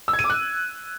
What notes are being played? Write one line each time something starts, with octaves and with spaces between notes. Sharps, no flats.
E6
G#6
D#7
D6
F#6